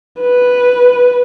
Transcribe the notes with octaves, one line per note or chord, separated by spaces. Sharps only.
B4